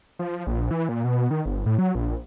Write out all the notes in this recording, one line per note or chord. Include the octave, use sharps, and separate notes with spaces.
F3
A#1
E3
A#2
B2
D#3
G1
A2
F#3
A#1